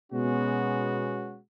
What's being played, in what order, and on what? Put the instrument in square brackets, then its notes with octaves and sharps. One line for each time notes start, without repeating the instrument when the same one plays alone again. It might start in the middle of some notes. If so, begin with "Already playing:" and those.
[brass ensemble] B2 G#3 B3 C#4 F#4